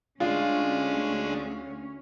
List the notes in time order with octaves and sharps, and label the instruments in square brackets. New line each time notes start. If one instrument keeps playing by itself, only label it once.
[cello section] D2 C#4 [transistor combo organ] G#3 D4 [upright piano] F4